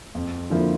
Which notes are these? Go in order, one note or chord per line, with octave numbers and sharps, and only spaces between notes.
F2
D3 F3 A#3 E4